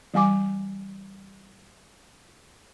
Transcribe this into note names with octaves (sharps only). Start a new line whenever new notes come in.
E3 G3 G#5 D6